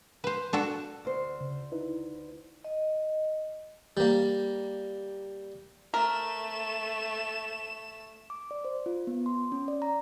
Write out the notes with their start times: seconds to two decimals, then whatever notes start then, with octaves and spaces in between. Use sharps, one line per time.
0.24 B4 C5
0.53 D4 F#4 A4
1.05 D2 C5
1.40 C#3
1.72 D#4 E4 B4
2.64 D#5
3.97 G3 A#3
5.94 A3 A#4 E7
8.30 D6
8.51 D5
8.65 C5
8.86 F4
9.07 B3
9.26 C6
9.52 C#4
9.68 D5
9.82 A#5